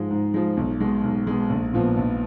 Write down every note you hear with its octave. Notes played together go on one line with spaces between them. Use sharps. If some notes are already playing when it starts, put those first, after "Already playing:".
Already playing: G#2 F3 G#3
G#2
F3 G#3
B1
B2 G#3
B1
B2 G#3
A#1
A#2 F3 B3
A#1